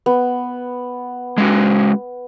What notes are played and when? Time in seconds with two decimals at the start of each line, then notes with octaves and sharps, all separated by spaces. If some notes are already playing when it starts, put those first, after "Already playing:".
0.06 B3
1.38 G#3 C#4 F#4